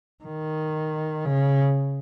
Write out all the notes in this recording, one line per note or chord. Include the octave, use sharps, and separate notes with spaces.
D#3
C#3